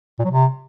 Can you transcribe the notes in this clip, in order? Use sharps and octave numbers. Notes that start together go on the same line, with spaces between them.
A#2
F#3
C3